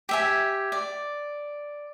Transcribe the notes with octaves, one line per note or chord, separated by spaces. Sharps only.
G4 E5 G#5
D5